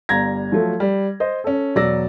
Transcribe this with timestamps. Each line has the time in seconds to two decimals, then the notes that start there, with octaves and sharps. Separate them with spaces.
0.09 G1 G3 A#5 G#6 A#6
0.52 F3 F#3 A3
0.80 G3
1.20 C5 D#5
1.44 C#4 A4
1.75 E1 F#3 D5 E6 A#6